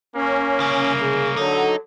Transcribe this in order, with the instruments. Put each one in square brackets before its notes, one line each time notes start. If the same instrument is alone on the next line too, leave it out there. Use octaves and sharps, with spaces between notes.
[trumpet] A#3 [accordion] C#4
[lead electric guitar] C2 C#3
[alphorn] G#4
[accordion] D3 F#3 [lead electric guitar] D#4 [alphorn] A4